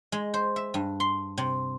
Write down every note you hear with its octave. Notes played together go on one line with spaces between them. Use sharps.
G#3
C5
E5
G2
C6
C3